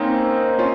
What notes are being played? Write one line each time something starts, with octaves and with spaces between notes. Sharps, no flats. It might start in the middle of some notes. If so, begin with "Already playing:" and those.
Already playing: A#3 C4 C#4 D#4
C#4 F4